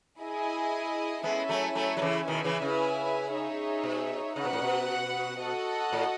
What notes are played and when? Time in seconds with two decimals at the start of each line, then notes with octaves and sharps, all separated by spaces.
0.19 E4 G#4 D#5 G#5
1.23 G#3 B3 C#4 E4 A4 E5 G#5
1.49 F#3 A3
1.75 F#3 A3
1.97 F#3
2.02 C#3 E3
2.28 B2 D#3 E4 B4 E5 G#5
2.44 C#3 E3
2.62 C#3
3.32 D#4 G#4 C#5 E5
3.84 B2
4.35 C#3 F#4 B4 F#5
4.45 B2
4.53 A2
4.62 B2
5.40 F#4 A4 D#5 F#5
5.93 A2